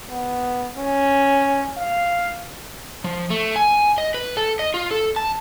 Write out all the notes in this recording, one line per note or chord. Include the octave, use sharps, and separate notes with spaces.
B3
C#4
F5
F3
A3
G#5
D#5
B4
A4
D#5
F4
A4
A5